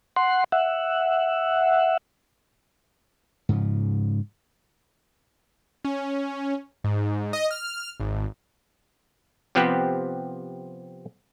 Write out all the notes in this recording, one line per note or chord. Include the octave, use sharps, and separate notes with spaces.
F#5 C6
E5 F#5
G#2 C#3 F3
C#4
G#2
D#5
F6
G#1
C3 F3 B3 C4 G4 B4